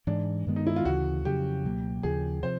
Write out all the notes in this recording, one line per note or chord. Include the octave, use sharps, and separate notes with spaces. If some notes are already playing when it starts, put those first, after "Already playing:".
G#2 E3 G#3 D4
G2 D#3 G#3 B3
D#4
E4
F4
D2 C#3 E3 F#4
F2 C#3 F#3 G4
C#2 B2 F#3 A#3
D#2 C#3 F3 G#4
C3 F3 C5